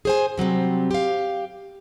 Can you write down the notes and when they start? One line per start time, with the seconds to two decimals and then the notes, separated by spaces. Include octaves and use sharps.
0.05 G#4 C5 G#5
0.37 C3 F#3 G3 C4
0.91 G4 F5